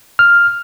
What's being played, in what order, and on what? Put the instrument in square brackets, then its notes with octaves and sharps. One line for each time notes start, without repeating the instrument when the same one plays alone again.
[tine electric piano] F6